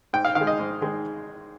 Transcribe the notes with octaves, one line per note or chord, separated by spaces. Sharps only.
G#2 G5
F5
D#3 F5
G#3
D#5
G#2
D#3 G#3